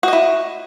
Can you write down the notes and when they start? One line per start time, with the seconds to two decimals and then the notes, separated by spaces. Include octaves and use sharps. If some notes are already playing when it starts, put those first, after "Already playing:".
0.03 F#4
0.08 D#5
0.13 E4